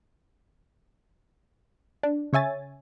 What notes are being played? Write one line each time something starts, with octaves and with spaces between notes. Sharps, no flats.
D4
C#3 C#5 E5 G#5 A6